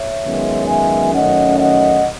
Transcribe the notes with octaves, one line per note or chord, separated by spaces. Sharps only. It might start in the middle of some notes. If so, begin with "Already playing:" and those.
Already playing: C#5 E5
F#2 D#3 G#3 B3
E5 G#5
F#2 D#3 A3 C#4 D#5 F#5
D#5 F#5